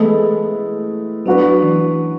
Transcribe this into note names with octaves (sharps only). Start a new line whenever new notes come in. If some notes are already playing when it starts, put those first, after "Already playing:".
Already playing: E3 G#3 A3 B3 E4 A4
F#3 B3 D4 F#4 B4
E3